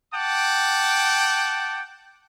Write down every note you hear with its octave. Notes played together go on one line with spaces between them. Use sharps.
F#5 G5 A5 D6